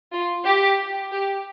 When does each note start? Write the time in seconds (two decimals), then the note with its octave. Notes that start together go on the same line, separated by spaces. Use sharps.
0.12 F4
0.45 G4
1.11 G4